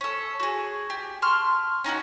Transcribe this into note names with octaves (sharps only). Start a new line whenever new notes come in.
C#4 A4
F#4 G#4
G4
A5 C6 C#6 F6
C#4 D#4 F4 F#4